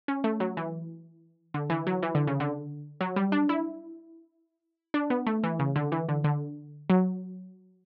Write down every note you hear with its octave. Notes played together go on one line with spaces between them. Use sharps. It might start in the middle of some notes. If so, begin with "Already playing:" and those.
C#4
A3
F#3
E3
D3
E3
F#3
E3
D3
C#3
D3
F#3
G3
D4
E4
D4
B3
A3
E3
C#3
D3
E3
D3
D3
F#3